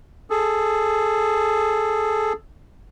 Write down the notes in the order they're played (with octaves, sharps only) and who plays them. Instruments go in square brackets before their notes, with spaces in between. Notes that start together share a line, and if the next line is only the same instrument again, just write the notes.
[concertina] G#4 A4